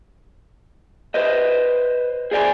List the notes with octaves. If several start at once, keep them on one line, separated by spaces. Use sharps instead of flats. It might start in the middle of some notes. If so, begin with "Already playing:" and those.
B4 C5 D#5
G#4 C5 D5 F5 G#5